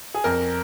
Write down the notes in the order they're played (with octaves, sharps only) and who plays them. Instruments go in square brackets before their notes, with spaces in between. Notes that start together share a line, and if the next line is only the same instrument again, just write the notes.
[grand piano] G#4
F2 A#4